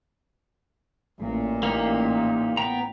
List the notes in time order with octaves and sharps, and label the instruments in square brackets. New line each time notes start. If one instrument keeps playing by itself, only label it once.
[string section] A1 A#2
[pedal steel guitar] A#3 D#4 G4
B3 G5 A#5